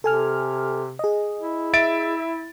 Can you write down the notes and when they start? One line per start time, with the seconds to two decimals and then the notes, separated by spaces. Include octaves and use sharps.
0.04 C3 A4 G#5 F6
0.99 G#4 D#5
1.40 E4
1.73 E5 A6 D7